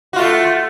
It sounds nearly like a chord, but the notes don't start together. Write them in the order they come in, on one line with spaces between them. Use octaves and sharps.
F#4 F4 A3